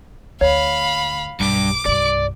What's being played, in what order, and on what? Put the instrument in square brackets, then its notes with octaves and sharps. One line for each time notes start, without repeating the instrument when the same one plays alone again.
[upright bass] D2 [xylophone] C#5 [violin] F5 B5
[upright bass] B1 [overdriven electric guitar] G2 G3 [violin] D6
[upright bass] C2 G2 [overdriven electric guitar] D5